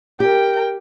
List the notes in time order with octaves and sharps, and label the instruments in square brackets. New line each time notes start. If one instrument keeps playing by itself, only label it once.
[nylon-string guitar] G4 [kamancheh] A#4 G5